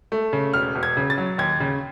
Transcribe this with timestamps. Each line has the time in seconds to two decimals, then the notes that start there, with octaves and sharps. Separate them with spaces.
0.12 A3
0.33 C#3
0.54 E1 F6
0.75 E1
0.83 G#6
0.97 C#3
1.10 A6
1.18 F#3
1.38 D#2 G#6
1.60 C#3